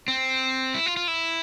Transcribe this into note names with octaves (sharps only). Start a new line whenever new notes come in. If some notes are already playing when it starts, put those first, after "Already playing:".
C4
E4
F4
F4
E4